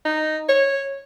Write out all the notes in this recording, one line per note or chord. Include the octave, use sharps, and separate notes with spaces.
D#4
C#5